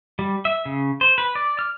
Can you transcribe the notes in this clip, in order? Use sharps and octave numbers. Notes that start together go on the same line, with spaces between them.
G3
E5
C#3
C5
B4
D5
F6